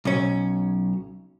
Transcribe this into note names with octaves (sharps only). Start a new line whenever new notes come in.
B1 C#4